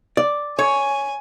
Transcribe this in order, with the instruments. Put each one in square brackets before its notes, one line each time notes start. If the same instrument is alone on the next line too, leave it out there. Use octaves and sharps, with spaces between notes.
[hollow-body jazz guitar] D5
[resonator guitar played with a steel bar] C#5 [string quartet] G#5